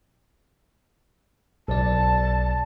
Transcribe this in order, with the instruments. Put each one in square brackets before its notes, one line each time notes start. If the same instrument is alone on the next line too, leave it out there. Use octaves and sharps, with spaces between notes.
[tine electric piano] B1 D5 [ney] A5